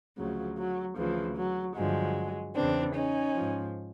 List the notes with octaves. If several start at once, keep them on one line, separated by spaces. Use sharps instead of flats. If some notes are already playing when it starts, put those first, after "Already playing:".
D2 C#3 F3 F#3
F#3
D2 C#3 E3 F3
F#3
G2 D3 F3 F#3 G#3
E2 C#3 E3 C4 D4
C#4 D#4
G#2 F3